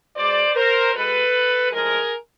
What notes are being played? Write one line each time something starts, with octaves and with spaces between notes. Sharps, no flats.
B2 G#3 C5 D5
A#4 C5
B2 G#3 A4 B4
A2 F3 G#3 G#4 A#4